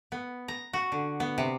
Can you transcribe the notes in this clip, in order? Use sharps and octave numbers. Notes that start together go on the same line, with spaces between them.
B3
A#5
F#4
D3
B3
C3